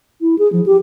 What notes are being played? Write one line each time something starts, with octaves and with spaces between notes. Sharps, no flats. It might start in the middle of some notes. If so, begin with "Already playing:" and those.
E4
G#4
F3
G4